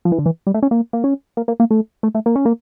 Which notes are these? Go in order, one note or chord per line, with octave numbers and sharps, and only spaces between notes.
F3
E3
D3
E3
G3
A3
C#4
A#3
A#3
C#4
A#3
A#3
A#3
A3
A3
A3
A#3
C#4
A#3